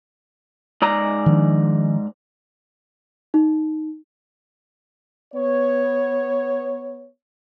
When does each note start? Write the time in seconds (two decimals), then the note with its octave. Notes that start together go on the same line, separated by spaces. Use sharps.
0.82 G#2 D5 A#5
1.26 D#3 F3 D4
3.34 D#4
5.33 B3 C#5